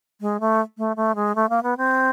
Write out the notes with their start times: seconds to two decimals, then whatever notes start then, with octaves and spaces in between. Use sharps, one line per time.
0.21 G#3
0.40 A3
0.78 A3
0.96 A3
1.15 G#3
1.35 A3
1.49 A#3
1.63 B3
1.77 C4